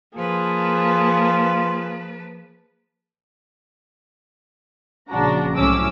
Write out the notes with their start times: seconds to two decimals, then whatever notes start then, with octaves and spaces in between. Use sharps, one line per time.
0.16 F3 A#3 F4 G#4 B4 A5
5.09 A#1 C#3 F3 D4 F#4 A#5
5.56 C2 A2 F#3 C#4 D6 E6